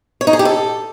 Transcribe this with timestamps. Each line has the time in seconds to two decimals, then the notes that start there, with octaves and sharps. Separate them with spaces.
0.21 C#5
0.27 D#4
0.33 G#4
0.39 G4
0.45 A4